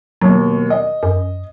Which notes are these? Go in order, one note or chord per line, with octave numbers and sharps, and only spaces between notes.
D#2 B2 F#3
D#5
F#2